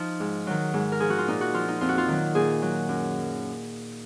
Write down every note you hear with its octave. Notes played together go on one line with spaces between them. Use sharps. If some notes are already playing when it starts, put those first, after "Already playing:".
Already playing: F3 D#4
G#2
D#3 F#3
G#2
A#4
F3 G#4
F#4
F4
A#2 D#4
F#4
F3 F4
D#4
F2 F4
F#4
F4
D#3 F#3
A#2 G#4
F#3
F#2